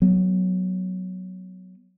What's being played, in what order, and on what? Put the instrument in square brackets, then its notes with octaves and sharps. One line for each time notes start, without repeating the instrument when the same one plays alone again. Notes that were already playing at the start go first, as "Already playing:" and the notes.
[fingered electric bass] F#3 B3